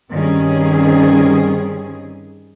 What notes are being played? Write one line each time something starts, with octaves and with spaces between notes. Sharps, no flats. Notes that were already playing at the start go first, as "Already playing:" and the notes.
G2 D#3 G3 C4 C#4 G#4